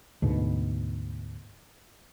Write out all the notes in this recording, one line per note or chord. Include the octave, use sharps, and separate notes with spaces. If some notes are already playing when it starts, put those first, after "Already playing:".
D2 G#2 B2